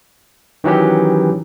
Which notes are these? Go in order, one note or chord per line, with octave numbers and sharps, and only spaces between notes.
D#3 E3 F#3 C#4 G4